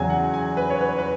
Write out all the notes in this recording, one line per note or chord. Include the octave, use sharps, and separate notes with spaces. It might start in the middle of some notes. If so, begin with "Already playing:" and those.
Already playing: E2 C#3 F#3 G#5
F#5
G#5
B4
C#5
B4
B4